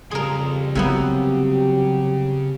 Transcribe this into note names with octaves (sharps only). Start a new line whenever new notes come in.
F2 C#3 G3 G#4 A#4 C6
C3 F#3 G3 A#3 B3 E4 G4